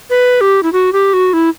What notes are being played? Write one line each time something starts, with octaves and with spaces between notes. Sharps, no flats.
B4
G4
E4
F#4
G4
F#4
E4